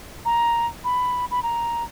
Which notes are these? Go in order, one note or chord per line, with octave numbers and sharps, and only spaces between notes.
A#5
B5
B5
A#5